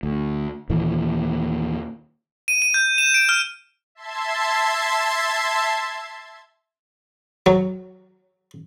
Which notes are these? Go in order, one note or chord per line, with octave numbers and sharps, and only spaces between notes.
D2
D#2 A#2 E3
D#7
D#7
G6
E7
D7
F6
E5 A5 C6 G#6
F#3